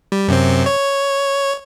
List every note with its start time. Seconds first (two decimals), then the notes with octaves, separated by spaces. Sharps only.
0.12 G3
0.28 F#2 C3 C4
0.66 C#5